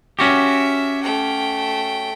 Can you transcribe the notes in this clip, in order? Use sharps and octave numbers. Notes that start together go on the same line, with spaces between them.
C#4 F#4 G4 E5
A3 G5